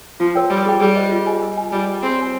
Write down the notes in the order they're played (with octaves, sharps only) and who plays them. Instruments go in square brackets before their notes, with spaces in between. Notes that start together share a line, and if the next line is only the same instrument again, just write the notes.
[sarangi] F3 [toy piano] F4
[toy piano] A#4 C#5 G5
[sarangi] G3 [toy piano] F4
[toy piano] G#4 C5 G5
[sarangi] G3 [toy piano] G#4
[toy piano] C5 D#5
F4
G#4 D#5 G#5
A#4
D#5 G#5
[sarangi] G3 [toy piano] F4
[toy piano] C5 G5
[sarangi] C4 [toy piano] G#4
[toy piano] C#5 G#5